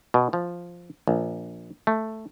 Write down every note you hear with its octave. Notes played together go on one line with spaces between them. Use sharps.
B2
F3
A#1
A3